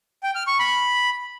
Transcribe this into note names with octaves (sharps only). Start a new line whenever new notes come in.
G5
F6
C#6
B5